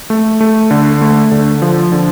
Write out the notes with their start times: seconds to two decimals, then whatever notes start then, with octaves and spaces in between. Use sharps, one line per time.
0.10 A3
0.40 A3
0.71 D3
1.01 A3
1.31 D3
1.62 F3
1.92 D3